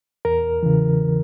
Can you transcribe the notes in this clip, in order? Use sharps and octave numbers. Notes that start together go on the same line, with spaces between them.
E2 A#4
C#3 E3